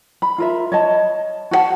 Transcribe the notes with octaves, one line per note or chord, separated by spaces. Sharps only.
B5
F4 A#4 E5
C#5 D#5 A5
F#4 A4 F#5 A5